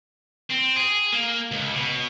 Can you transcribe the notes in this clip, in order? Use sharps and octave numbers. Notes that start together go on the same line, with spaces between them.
C4
G#4
A#3
C#2
B2